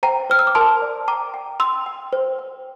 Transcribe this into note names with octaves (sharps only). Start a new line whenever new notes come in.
C5 G5 A#5
C5 F6
E6
D6
A#4 A5 C6
D5
G5 A#5 D6
G5
G5 C6 E6
G5
C5
G5